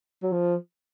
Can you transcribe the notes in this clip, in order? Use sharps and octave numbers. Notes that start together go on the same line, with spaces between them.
F#3
F3